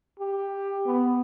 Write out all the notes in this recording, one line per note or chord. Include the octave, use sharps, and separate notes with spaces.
G4
B3